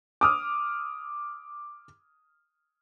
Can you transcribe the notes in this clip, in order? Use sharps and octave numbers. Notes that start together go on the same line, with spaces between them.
D6 D#6 F6